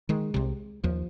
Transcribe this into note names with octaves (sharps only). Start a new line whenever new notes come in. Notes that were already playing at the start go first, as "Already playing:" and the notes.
D#3 G#3
C2 C3
D#2 F3